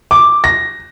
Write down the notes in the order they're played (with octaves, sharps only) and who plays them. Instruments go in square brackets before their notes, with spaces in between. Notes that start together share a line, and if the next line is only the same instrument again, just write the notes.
[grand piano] D6
A#6